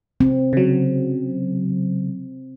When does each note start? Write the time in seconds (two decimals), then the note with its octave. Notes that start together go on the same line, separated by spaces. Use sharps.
0.21 C4
0.53 C#3 F#3